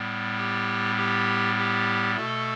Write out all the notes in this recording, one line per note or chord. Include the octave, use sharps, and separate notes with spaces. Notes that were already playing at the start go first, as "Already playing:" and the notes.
Already playing: A2 G3 B3
G4
G4
G4
B2 A3 A4